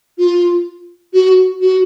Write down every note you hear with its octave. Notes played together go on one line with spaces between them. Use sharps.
F4
F#4
F#4